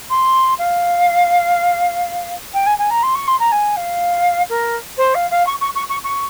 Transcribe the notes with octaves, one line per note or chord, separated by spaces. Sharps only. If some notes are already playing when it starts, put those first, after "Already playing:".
C6
F5
G5
G#5
G#5
A#5
C6
C#6
C6
A#5
G#5
F5
A#4
C5
F5
F5
C#6
C#6
C#6
C#6
C#6